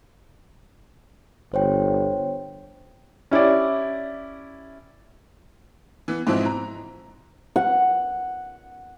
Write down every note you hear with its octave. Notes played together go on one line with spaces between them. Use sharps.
G1 C5 C#5 G5
C#4 E4 G4 D5
E3 B3
G#2 B2 E3 F3 C4 E4
A#5
F#5